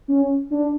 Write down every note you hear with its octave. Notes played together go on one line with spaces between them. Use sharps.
C#4
D4